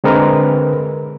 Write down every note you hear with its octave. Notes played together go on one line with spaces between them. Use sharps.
D3 G#3 C4 A#4 B4